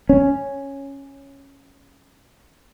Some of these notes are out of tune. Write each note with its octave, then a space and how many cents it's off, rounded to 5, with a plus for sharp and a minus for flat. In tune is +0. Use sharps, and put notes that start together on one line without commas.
C#4 -5